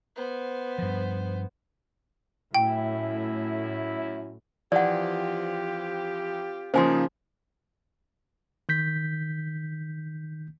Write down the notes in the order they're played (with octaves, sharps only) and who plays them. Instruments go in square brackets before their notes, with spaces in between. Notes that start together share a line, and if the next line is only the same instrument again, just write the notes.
[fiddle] B3 C5
[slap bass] G2 F3
[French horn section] F#2 C#4 E4 [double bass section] A2 [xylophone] G5
[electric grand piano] E3 F3 [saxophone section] C4 F4 G4 [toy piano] D5 F#5
[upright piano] C#3 F3 [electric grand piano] A#3 D#4 G#4 [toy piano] C5 G#5 C6
[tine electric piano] D#3 G6 B6